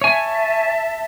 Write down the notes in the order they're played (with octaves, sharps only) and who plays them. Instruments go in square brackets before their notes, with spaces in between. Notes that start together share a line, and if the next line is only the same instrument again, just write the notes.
[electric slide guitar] C#5 G#5 [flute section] E5 A5